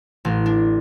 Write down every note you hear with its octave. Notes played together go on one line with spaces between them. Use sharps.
A1
D4